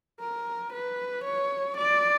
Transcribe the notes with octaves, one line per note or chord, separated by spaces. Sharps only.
A#4
B4
C#5
D5